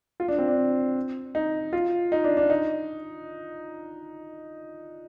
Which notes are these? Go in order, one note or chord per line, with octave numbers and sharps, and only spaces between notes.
F4
D4
C4
D4
D#4
F4
D#4
D4
D4
D#4